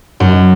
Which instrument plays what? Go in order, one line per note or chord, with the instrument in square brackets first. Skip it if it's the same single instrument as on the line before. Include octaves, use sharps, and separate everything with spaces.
[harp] F#2